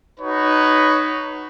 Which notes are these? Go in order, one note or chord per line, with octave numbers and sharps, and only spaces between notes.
D#4 F#4 B4 C#5